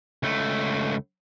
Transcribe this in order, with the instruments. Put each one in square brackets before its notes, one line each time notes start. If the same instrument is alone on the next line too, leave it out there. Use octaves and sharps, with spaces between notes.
[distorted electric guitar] C#2 A3